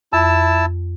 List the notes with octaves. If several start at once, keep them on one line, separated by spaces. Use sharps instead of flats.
F2 E4 A5 E6